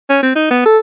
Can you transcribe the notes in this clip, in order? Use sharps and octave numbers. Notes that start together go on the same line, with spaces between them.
C#4
C4
D#4
B3
A4